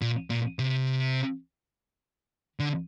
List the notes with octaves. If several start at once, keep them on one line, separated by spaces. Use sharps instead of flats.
A#2
A#2
C3
D3